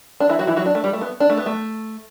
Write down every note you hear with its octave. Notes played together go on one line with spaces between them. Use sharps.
D4
E3 E4
F#3 F#4
E3 E4
F#3 F#4
D4
A3
G3
A3
B3
D4
A3
B3
A3